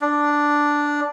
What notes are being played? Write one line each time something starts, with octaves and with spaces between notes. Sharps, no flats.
D4